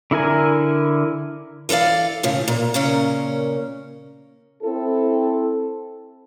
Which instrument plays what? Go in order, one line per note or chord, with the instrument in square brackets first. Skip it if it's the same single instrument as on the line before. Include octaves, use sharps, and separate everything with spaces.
[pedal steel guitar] D3 E4 A#4 G#5
[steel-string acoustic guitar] E3 A4 A#4 D5 F5
A2 C#3 E3
A#2
A#2 C#3 C#4 A#4
[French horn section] C4 E4 A4